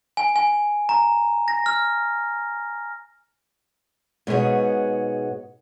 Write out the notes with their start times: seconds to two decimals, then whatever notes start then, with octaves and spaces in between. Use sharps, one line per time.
0.17 G#5
0.36 G#5
0.89 A#5
1.48 A#6
1.66 F6
4.27 G#2 B2 B3 G#4 C#5